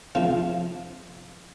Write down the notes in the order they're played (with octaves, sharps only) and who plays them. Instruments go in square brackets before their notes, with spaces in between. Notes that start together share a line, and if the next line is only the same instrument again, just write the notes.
[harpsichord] C3 F3 C4 F4